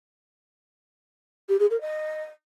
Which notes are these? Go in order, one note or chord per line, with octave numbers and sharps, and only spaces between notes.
G4
G#4
A#4
D#5